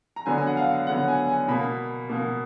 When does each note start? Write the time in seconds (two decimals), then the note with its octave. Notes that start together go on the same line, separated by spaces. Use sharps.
0.16 A#5
0.26 D3 F#3 B3 G#5
0.38 G#5
0.47 F#5
0.57 F5
0.87 D3 F#3 B3 F#5
1.08 G#5
1.28 G#5
1.48 B2 A#3 B5
2.09 B2 A#3